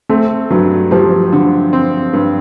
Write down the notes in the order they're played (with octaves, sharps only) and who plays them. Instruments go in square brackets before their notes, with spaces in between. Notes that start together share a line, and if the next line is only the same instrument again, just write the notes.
[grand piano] A3 [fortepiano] C4
[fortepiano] G2 [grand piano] F#3
[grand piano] F3 [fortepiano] G3
[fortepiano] D3
C4
G2